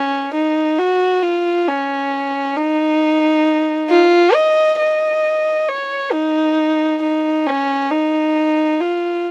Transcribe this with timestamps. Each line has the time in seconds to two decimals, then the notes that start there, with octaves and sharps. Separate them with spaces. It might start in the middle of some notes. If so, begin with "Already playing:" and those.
Already playing: C#4
0.33 D#4
0.78 F#4
1.22 F4
1.67 C#4
2.56 D#4
3.90 F4
4.34 D#5
4.79 D#5
5.69 C#5
6.13 D#4
7.02 D#4
7.46 C#4
7.91 D#4
8.80 F4